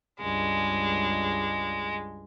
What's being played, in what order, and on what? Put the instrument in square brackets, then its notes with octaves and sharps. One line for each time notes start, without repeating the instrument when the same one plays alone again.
[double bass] C#2 G2 [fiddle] G#3